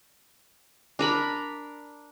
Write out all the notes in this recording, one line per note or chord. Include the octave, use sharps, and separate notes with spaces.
D4 A#4 B5